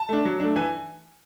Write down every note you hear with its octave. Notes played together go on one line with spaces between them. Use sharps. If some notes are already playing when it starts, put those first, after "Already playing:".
Already playing: A5
A3 D4
F#3
A3 D4
E3 G#5